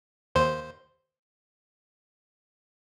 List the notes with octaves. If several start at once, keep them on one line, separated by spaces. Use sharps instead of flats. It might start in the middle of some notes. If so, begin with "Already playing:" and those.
D#2 C5